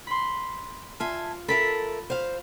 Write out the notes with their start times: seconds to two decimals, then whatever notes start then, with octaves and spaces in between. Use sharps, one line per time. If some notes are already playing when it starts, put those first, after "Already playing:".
0.07 B5 C6
1.00 F4 E5 G#5 A5
1.48 A4 A#4 E5 B5 A6 B6
2.10 C5 F5